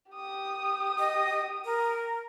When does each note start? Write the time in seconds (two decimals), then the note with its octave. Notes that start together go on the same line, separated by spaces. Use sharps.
0.11 G4 D#6
0.99 D#5
1.65 A#4